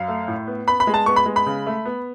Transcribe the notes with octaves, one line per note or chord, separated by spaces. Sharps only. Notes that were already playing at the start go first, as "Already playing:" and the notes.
Already playing: F#2 F5
A3
A2
B3
B3 B5
B5
G#3
A5
B3 C#6
B5
G#3
B5
C#3
A3
B3